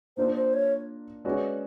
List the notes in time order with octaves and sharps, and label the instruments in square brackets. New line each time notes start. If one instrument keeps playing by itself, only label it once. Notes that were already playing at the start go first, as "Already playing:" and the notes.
[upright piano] A#3 D4 F4 A#4 D5 [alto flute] C5
[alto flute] C5
C#5
[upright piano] G#3 C#4 F#4 B4 D5